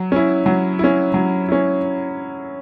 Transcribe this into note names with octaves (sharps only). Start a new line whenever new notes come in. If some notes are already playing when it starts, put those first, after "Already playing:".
Already playing: F#3
C#4 E4
F#3
C#4 E4
F#3
C#4 E4